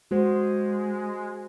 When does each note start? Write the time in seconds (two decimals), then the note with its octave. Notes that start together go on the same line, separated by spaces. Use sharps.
0.11 G#3 F#4 C5